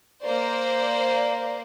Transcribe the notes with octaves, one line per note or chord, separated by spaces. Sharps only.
A#3 C5 D5